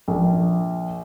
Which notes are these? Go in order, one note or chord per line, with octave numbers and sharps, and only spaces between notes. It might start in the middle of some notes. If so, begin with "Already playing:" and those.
A#1